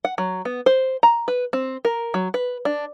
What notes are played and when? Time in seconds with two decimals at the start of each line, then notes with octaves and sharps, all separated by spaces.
0.05 F#5
0.18 F#3
0.45 B3
0.66 C5
1.03 A#5
1.28 B4
1.53 C4
1.85 A#4
2.14 F#3
2.34 B4
2.65 D4